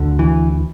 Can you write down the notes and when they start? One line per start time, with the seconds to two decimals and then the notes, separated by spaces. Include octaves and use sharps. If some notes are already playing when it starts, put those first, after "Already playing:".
Already playing: D2 D3
0.19 E3